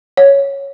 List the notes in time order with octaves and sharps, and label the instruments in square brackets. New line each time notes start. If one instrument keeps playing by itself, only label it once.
[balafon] C#5